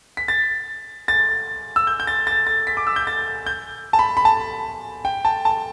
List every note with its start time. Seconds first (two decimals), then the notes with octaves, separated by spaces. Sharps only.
0.17 B6
0.28 A6
1.08 A6
1.76 E6
1.87 G6
2.00 G6
2.07 A6
2.27 A6
2.47 A6
2.67 B6
2.77 D6
2.87 E6
2.96 G6
3.07 A6
3.46 G6
3.93 A5
3.99 B5
4.17 B5
4.25 A5
5.05 G5
5.25 A5
5.45 A5